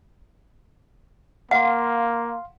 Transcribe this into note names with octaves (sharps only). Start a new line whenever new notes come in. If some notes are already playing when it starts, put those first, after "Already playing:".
A#3 F5 F#5 C6